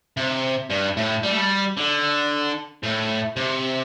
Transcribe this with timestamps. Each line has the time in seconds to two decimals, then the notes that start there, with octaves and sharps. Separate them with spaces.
0.17 C3
0.70 G2
0.97 A2
1.23 G3
1.30 A3
1.37 G3
1.77 D3
2.83 A2
3.36 C3